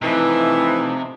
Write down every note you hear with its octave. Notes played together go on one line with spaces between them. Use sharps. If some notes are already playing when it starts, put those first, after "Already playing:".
C3 E3 F3 A3 D#4